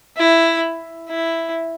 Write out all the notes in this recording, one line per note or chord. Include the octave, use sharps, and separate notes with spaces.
E4
E4